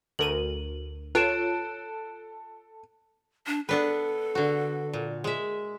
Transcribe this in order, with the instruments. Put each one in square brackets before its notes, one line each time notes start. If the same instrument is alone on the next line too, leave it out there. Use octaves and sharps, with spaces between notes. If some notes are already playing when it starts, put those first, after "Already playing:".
[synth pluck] D2 A#4 D#7 [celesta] F#7
[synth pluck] F4 C#5 [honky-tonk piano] A4 [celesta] F#6 D7 E7
[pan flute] D4
[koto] B3 D4 B4 [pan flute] A4
[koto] D3 F#4
A#2
G#3 E5